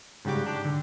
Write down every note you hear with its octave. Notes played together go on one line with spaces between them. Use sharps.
G#2 C#3 G3 F#4 G4 D6
D4 G4
D3